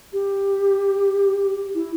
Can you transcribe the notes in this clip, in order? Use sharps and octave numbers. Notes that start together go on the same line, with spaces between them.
G4
E4